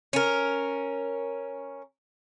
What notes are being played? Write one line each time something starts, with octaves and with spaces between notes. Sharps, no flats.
C#4 A#4